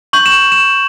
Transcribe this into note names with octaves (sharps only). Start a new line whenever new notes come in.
C#6 G6 F#7
E7
E7